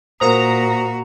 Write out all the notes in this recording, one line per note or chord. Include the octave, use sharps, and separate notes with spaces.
A#2 F#4 A#4 C5 A#5 D#6